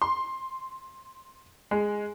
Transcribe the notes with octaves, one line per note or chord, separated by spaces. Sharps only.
C6
G#3